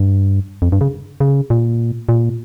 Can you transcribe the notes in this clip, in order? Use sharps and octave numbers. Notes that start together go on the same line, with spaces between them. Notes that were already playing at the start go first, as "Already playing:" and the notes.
Already playing: G2
F2
G2
C#3
C#3
A#2
A#2